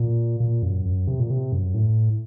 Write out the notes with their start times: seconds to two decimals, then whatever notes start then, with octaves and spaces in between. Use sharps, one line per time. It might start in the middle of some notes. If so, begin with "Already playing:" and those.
Already playing: A#2
0.40 A#2
0.63 F#2
0.85 F#2
1.07 C3
1.20 A#2
1.30 C3
1.52 F#2
1.74 A2